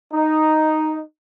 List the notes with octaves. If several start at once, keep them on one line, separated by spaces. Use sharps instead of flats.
D#4